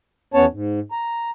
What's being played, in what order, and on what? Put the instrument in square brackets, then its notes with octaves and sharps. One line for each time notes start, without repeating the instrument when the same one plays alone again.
[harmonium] E2 B3 C#4 C#5 A5
G#2
A#5